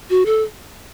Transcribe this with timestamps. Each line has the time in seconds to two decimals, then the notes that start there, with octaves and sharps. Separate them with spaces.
0.10 F#4
0.26 A4